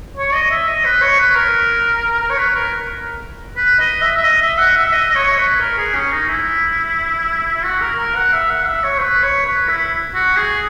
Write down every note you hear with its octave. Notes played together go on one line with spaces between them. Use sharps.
C#5
D#5
E5
D#5
B4
C#5
B4
A#4
A#4
C#5
B4
A#4
B4
D#5
E5
E5
D#5
E5
F#5
E5
E5
D#5
D#5
C#5
B4
A#4
G#4
C#4
D#4
E4
E4
F#4
A#4
A#4
F#5
E5
F#5
E5
C#5
B4
C#5
B4
E4
F#4
G#4